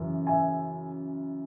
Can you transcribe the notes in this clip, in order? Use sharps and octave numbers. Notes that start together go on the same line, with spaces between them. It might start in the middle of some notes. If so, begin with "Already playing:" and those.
Already playing: F#2 C#3 E3
E5 G#5